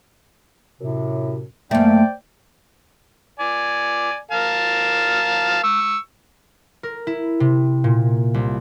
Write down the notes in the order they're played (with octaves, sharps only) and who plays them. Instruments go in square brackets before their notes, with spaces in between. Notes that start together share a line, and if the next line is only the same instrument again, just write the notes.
[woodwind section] F#2 A2 C3
[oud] F#2 A3 [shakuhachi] A#3 [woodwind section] C5 D5 G5
[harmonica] D5 G#5
A#4 F5 A5
C#6 E6
[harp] A#4
E4
C3
A#2
C2